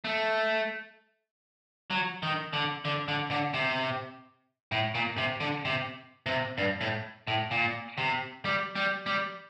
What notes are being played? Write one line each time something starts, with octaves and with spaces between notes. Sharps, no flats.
A3
F#3
D#3
D3
D3
D3
D3
C3
A2
A#2
C3
D3
C3
C3
G2
A2
A2
A#2
C3
G3
G3
G3